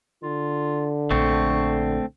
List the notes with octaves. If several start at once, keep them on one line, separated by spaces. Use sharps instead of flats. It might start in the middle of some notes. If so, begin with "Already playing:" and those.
D3 F4
A#1 A3 C4 C#6